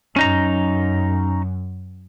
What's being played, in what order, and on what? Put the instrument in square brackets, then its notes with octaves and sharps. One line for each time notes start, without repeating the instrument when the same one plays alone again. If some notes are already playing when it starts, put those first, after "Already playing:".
[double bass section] F#2 [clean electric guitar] C#4 D#4 A#5